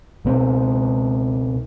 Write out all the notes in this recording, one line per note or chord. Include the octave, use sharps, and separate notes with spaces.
C#2 B2 C4